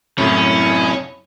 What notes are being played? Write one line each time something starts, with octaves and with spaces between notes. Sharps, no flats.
F#2 A2 C3 F#3 C#4 E4